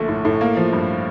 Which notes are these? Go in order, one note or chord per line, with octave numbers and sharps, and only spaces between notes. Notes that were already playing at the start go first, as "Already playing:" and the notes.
Already playing: A#1 D3 A3
A2
A2
A#3
F3
G2